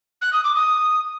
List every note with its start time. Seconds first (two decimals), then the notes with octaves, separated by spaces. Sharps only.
0.21 F#6
0.32 D#6
0.44 D6
0.55 D#6